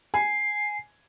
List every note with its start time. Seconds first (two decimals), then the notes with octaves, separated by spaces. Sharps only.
0.14 G#5 C7